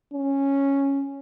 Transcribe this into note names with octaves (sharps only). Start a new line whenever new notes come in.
C#4